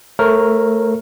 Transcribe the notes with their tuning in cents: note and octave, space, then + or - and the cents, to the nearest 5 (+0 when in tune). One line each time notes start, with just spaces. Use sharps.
A3 +10 A#4 +0 C#5 -35